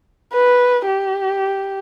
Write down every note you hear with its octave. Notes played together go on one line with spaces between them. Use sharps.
B4
G4